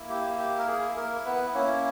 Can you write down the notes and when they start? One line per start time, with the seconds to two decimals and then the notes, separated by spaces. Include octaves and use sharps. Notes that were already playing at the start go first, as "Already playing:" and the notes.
Already playing: A#3 E4
0.09 G4
0.38 G4
0.59 A#4
0.67 G#4
0.96 A#3 A#4
1.26 B3 B4
1.54 A#3 C#4 E4 C#5